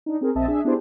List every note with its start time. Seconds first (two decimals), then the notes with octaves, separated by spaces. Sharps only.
0.06 D4 D#4
0.21 C4 G#4 A#4
0.35 A#1 C4 D#5 E5 A5
0.48 D4 G#4 E5
0.65 B3 D4 E4 G4 G#4 C5